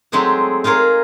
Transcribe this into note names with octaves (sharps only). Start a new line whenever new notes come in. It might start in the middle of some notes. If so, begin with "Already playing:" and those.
F#3 G#3 A3 C4 D#4 G#4
D#4 F4 G#4 A#4 C#5